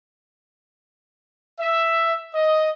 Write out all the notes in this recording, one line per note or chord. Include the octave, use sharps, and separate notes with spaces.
E5
D#5